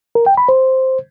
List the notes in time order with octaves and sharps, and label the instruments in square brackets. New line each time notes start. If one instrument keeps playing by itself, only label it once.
[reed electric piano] A#4
G5
B5
C5